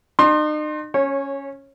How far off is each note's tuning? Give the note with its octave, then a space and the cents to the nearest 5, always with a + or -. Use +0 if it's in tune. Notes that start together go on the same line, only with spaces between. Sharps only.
D#4 -40 C6 +20
C#4 +0 C#5 -20